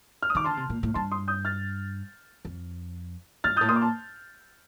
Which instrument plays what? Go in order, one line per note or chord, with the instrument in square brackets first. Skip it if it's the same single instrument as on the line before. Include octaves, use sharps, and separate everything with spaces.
[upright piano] F6
D#6
[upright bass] D#3 [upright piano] D6
[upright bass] D3 [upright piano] A5 C6
[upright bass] C3
A#2
A2
[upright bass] G2 [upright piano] A5 C6
[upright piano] C6 D#6
D#6 G6
F6 A6
[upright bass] F2
[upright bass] G2 [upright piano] F6 A6
[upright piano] D#6 G6
[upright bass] A2
[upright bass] A#2 [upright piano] C6 D#6
[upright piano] D6
A5 C6